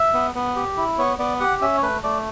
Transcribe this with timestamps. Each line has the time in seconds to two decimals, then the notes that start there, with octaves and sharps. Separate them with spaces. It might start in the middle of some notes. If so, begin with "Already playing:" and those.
Already playing: E5
0.14 B3
0.35 B3
0.56 G4
0.77 E4
0.98 B3 C#5
1.19 B3 D5
1.40 G4 F#5
1.61 C#4 E5
1.77 C#5
1.83 A3 B4
2.03 A3 D5